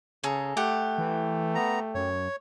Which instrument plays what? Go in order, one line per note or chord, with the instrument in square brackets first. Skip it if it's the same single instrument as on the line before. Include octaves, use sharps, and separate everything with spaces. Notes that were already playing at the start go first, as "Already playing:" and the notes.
[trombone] C#3 [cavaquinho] G#4 A4 A#5
[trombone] A3 [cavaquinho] G4 F#5
[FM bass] E3
[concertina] B3 A#5
[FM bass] F#2 [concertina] C#5